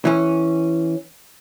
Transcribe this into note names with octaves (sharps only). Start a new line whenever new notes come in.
E3 C#4